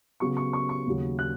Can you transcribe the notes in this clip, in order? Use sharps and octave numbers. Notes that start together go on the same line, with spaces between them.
C#3 F#3 B3 C#6
C#6
C#6
C#6
D#2 C#3 F#3
F#6